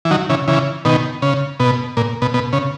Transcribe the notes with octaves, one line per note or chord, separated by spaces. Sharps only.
E3
D#3 F#3
C#3 E3
C#3 E3
B2 D#3
C#3
B2
A#2
B2
B2
C#3